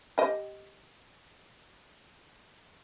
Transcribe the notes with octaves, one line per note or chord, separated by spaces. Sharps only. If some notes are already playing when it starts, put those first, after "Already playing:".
G4 D#5